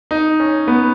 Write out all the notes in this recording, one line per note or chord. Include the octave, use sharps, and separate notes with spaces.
D#4
C#4
B3